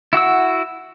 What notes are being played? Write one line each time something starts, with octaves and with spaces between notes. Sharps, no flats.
E4 F#4 F#5 E6